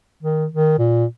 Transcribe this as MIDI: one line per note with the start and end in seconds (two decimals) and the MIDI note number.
0.23 0.47 51
0.52 0.74 51
0.79 1.06 46